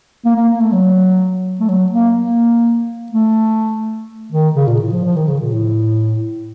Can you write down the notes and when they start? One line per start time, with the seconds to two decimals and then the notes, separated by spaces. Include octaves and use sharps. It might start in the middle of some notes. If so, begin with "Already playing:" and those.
0.25 A#3
0.36 A#3
0.49 A#3
0.60 A3
0.72 F#3
1.60 A3
1.68 F#3
1.92 A#3
2.16 A#3
3.12 A3
4.32 D#3
4.55 C#3
4.67 A#2
4.81 A2
4.92 F3
5.05 F3
5.16 D#3
5.28 C#3
5.40 A#2
5.52 A2